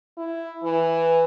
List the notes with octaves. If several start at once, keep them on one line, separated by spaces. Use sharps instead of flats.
E4
E3